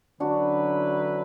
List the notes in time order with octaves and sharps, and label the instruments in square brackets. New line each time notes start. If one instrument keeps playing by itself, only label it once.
[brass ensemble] D3 F#3 C#4 E4 B4 [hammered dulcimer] D4 F#4